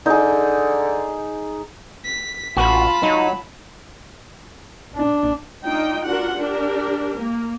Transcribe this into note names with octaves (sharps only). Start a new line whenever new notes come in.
D3 D#4 G#4
B6
A1 F4 F#4 A5 B5
F#3 D#4
D4
D4 D#4 F4 G5
D4 F4 F#4 A#4 F#5
D4 G4 A#4
A#3